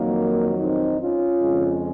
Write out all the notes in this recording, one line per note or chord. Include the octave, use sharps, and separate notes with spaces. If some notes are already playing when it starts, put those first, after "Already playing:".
Already playing: F2 D#3 F#3 A#3
C4 D#4
C#4 F4
F2 C#3 G#3